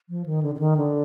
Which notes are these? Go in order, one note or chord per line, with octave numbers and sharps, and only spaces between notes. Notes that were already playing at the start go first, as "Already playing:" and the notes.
F3
D#3
D3
D3
D#3
D3